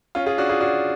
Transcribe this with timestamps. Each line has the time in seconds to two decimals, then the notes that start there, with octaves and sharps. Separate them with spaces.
0.15 C#4 F4
0.26 F4 G#4
0.38 D4 F#4
0.49 F4 G#4
0.60 D4 F#4